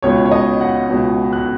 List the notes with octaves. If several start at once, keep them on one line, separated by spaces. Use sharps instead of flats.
C#2 B2 C#5
C#5
D#5
F#5
C#2 B2
F#6